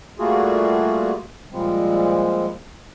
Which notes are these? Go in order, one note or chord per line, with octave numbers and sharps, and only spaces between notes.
G3 A3 A#3 F4 F#4 G#4
A#2 F3 G3 G#3 C4